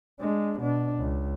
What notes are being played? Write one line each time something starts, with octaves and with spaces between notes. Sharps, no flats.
G#3 D4
B2 D4
C#2